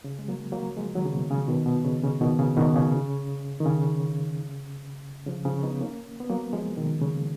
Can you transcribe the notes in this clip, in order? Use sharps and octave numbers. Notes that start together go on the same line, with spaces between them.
C#3
G#3
F#3 A#3
F#3 A#3
F3 G#3
D#3 F#3
C#3
B2
C#3
B2 D#3
B2
C#3
C#3
B2 D#3
C#3
B2 D#3
C#3
D#3
C#3
C#3 F3
C#3 F3
B3 D#4
A#3 C#4
B3
F#3 A#3
F3 G#3
B2 D#3
C#3